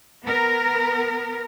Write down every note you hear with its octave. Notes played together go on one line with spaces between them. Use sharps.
B3 A#4